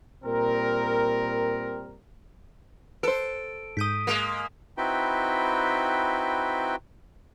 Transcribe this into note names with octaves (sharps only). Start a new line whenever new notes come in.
A#2 G3 C4 A#4
A4 B4 C5 D7
G#2 D#6 G6 B6 D#7
G#3 A#3
C4 D#4 E4 F#4 B4 G5